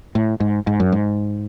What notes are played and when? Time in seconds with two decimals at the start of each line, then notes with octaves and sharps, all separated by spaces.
0.15 A2
0.40 G#2
0.67 G#2
0.80 F#2
0.92 G#2